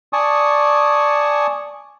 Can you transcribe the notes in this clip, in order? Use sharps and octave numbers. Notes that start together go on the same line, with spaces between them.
D5 G#5 A5 C#6 D#6